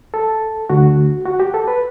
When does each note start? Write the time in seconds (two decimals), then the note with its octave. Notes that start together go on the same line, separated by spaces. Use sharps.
0.14 A4
0.69 D2 D3 A3 F#4
1.26 F#4
1.40 G4
1.54 A4
1.68 B4